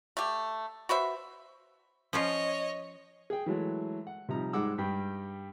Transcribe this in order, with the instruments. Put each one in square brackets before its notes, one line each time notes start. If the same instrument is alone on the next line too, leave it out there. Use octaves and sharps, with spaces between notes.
[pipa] A3 G4
F#4 B4 C5 E5
[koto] F3 C#4 F4 [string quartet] C#5 D#5
[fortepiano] G#4 G5
E3 F#3 G#3 A3
F#5
C3 F3 G3 D#4 A#5
G#2 G3 G#3 F#5 D6 E6
G2 G3 G5